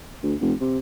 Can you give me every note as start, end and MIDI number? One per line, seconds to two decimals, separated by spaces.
0.23 0.35 38
0.41 0.53 29
0.61 0.78 48